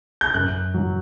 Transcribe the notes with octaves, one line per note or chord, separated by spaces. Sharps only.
G6
F#2 F#6
F#3